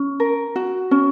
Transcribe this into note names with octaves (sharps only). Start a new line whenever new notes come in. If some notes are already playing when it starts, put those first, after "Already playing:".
Already playing: C#4
A#4
F#4
C#4